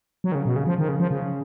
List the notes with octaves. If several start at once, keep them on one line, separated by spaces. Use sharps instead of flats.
F#3
D#3
C#3
B2
C#3
F3
D#3
C#3
F3
C#3